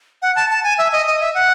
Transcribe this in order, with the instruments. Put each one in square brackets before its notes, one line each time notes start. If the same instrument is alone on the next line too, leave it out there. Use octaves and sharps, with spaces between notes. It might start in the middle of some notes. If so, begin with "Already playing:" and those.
[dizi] F#5
A5
A5
G#5
E5
D#5
D#5
E5
F#5